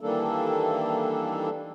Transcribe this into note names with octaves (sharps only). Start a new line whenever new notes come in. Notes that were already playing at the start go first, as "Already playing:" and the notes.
D#3 E3 G3 A#3 D4 A4